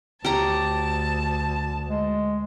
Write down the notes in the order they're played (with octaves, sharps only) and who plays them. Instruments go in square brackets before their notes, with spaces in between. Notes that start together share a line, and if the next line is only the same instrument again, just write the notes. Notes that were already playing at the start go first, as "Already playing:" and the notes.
[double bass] D2 [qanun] G4 C#5 A#5 [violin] A5
[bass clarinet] G#3